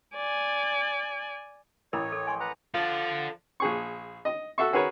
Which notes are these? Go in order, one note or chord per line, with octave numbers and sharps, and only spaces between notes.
D5 G#5
A1 E4 A#4 C#5 B5
A4
G#5 C6 C#6
B4 F#5 A#5
F3 A4 D5
A#1 G#4 C#6
D#5
F#4 A4 E5 C#6
C#4 F#4 G#4 A#4 B4 C#5